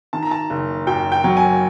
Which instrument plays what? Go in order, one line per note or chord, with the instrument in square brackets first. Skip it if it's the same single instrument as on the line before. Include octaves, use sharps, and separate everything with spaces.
[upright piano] D#3 A5
A#5
A5
F#1
F#2 G5
G5
F#3
G#5